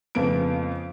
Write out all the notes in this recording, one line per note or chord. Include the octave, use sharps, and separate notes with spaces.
F2 C#3 A3 B3 D7